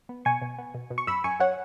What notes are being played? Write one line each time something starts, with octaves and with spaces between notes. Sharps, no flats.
B3
B2 G#5 C#6
B2
B3
B2
B2
C#6
F#2 B5 E6
F#2 G#5 C#6
F#2 C#5 F#5